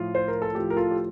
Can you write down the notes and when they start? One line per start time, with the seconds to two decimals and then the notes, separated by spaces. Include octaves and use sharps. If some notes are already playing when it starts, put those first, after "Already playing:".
Already playing: A2 F3 F4
0.15 C5
0.28 A#4
0.42 A4
0.55 A2 F3 G4
0.70 A#4
0.77 F4 A4
0.91 G4